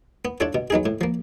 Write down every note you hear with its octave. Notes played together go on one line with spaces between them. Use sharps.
B3
D4 F4 A4 C#5
B2
F#3 B3 D#4 G#4
A2
F3 A#3